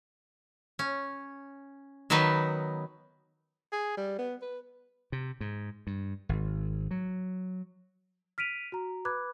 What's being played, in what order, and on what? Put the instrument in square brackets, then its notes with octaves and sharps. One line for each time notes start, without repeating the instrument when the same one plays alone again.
[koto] C#4
D#3 F#3 B3 D#4 B4
[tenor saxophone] G#4
G3
B3
B4
[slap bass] C3
G#2
G2
G#1
F#3
[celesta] F6 B6 D7 D#7 F7
F#4 A#5
B4 B5 D6 F#6 G#6